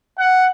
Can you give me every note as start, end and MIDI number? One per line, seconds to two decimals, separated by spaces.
0.19 0.46 78